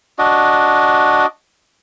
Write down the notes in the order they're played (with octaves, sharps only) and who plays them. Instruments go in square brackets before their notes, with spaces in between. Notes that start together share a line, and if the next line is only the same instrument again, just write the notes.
[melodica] D4 F#4 D#5